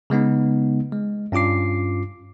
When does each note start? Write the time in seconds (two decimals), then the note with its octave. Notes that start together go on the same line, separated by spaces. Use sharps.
0.10 C#3 G#3 B3 D#4
0.92 G#3
1.32 G2 C#4 F4 D6 C7